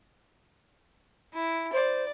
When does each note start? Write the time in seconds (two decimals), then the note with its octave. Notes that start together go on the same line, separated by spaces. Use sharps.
1.34 E4
1.73 C5 D5